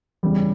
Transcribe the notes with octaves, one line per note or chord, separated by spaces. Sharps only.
E2 C#3 E3 G3